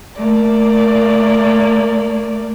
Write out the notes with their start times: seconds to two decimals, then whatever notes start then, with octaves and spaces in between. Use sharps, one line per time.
0.17 A3 A#3 D5